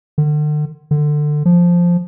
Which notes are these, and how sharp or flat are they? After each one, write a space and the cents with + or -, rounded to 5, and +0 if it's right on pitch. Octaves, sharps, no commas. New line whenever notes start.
D3 +40
D3 +20
F3 +0